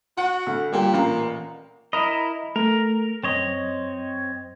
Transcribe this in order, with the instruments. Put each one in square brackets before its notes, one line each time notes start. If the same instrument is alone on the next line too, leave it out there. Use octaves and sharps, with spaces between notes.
[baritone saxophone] F#4 [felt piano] F#5
[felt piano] D2
[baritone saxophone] A#2 [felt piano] G3 G4
[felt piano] A1 F5 A#5
[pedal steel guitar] E4 A#4 D#5 [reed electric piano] B5 D#6
[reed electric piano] A3 [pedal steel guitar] A#4
[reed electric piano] F#2 [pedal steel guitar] C4 C#5 D#5